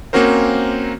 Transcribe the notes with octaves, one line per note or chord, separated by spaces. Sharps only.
A#3 C4 C#4 F#4 A#4 C5